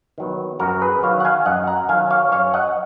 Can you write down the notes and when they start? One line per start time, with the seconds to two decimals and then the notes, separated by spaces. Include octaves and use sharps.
0.18 D#3 F#3 B3
0.60 F#2 F#4 A#4
0.81 G#4 B4
1.03 D#3 F#3 C#5 F5
1.20 F#5
1.25 F5 G#5
1.46 F#2 D#5 F#5
1.67 F#5 A#5
1.89 D#3 F#3 F5 G#5
2.11 C#5 F5
2.32 F#2 C#5 F5
2.54 D#5 F#5